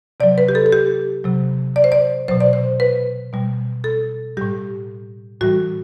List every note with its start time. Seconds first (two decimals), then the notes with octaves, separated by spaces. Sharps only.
0.20 C3 F#3 D5
0.38 B4
0.49 G4
0.55 A4
0.66 A4
0.72 G4
1.24 C3 F#3
1.76 D5
1.84 C5
1.92 D5
2.28 B2 F#3 C5
2.40 D5
2.53 C5
2.80 B4
3.33 B2 G3
3.84 A4
4.37 A2 G3 G4
5.41 A2 E3 G3 F#4